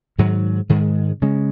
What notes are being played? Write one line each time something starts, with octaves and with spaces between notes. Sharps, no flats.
G#2 D#3 F#3
G#2 D#3 G#3
C#3 G#3 C#4